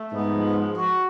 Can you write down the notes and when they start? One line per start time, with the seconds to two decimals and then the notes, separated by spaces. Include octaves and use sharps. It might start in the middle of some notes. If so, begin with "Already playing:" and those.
Already playing: A3
0.11 G#2 B3
0.33 F3
0.54 G#3
0.76 F#4